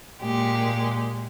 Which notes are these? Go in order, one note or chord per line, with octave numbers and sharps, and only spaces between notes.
A#2 G#3 G4